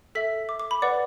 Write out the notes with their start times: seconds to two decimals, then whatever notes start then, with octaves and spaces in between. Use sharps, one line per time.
0.15 A4 E5 B6
0.49 D6
0.60 D6
0.71 B5
0.82 B4 D5 F#5 D6